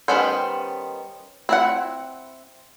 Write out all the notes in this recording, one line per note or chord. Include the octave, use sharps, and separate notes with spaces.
D#3 G3 B3 C#4 C5
C4 E4 F#5